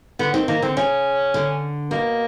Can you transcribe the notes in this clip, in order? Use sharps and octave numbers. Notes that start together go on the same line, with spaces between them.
D3 B3
D#3 C4
D#3 A#3
D3 C4
C#3 C#4
D3
B2 A#3